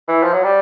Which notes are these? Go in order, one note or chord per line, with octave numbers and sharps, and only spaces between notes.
E3
F3
F#3
G3